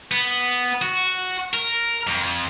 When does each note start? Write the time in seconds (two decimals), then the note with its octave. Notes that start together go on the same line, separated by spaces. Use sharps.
0.12 B3
0.82 F#4
1.54 A#4
2.07 F2